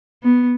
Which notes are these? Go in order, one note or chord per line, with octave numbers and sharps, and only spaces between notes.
B3